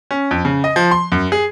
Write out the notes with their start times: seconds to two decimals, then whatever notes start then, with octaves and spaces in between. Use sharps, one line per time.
0.11 C#4
0.31 F2
0.45 C#3
0.64 D#5
0.76 F3
0.91 C6
1.12 F#2
1.32 G#4